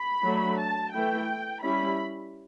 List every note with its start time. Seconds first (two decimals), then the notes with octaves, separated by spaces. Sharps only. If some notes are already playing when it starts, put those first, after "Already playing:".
Already playing: B5
0.25 F#3 A3 D4
0.59 A5
0.93 E3 A3 E4 G5
1.62 G3 C#4 E4 B5